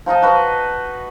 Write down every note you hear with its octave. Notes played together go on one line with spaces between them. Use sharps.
F3 D#4 D#5 A5
F#4 B4 D#5